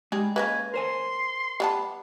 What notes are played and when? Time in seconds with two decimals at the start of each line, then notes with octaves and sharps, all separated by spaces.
0.12 G3 G#3 D#4 G#4
0.36 G#3 A#3 C#4 B4 G#5
0.74 A#4 C5 G#5 C6
1.60 G3 B3 A5